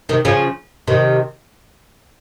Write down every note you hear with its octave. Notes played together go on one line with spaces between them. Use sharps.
C3 D#3
C#3 F3
C3 D#3